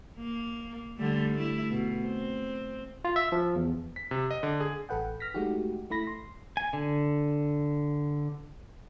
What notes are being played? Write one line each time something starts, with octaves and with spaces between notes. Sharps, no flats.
A#3
D3 G3 A3
A3 E4
B2
C4
F4
E5
F3
E2
B6
C3
D#5
D3
G#4
A1 A4 B4 F#5 G5
F6 A#6 B6
G#3 A3 D#4 F#4 G4
A3 E4 B5 A#6
C6
G#5
D3